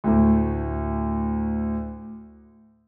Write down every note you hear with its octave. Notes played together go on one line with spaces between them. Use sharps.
D2 A2